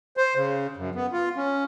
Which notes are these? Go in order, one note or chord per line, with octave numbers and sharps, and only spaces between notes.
C5
C#3
F#2
B3
F4
C#4